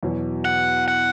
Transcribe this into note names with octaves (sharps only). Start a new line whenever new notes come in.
E2 B2 F#3
F#5
F#5